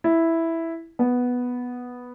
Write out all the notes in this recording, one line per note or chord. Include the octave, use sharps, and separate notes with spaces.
E4
B3